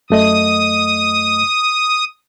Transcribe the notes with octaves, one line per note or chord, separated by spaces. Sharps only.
F#2 A3 D#5 D#6